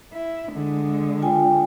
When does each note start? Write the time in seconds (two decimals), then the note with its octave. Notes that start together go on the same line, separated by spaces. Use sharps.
0.13 E4
0.52 D3 G#3
1.22 F4 G5 G#5